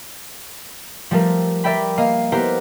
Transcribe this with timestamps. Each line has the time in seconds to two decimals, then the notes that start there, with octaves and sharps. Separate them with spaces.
1.11 F3 G3 A3 A#4
1.64 A#4 D5 E5 G5 B5
1.98 A#3 D#5 F5 D#7
2.32 B3 E4 G4 A#4 C5 A#5